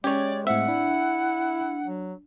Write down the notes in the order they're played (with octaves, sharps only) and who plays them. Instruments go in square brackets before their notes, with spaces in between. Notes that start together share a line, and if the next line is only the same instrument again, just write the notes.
[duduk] G#3 [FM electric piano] C#4 G#6 [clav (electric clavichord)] G4 C#5 [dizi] D5
[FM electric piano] A2 C4 [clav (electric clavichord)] E5 [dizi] F#5
[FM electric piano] D4 [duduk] E4
[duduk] F#3